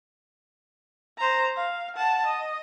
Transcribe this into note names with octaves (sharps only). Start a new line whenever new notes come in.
C5 A#5
F5
F#5 A5
D#5